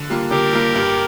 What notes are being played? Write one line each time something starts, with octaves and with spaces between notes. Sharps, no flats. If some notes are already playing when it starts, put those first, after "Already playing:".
Already playing: D3
G3 A#3 F4
D3 G4 A#4
G3 A#3 F4
G2